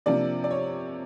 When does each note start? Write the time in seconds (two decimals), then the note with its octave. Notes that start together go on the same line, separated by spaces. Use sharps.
0.06 C3 F3 A#3 D4 D5
0.44 D5
0.51 C#5